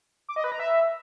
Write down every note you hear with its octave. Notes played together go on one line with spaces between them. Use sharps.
D6
D#5
B4
A#5
E5